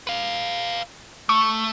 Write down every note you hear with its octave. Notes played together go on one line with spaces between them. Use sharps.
B4 F5
A3 C#6